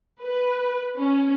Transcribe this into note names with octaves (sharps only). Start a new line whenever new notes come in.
B4
C#4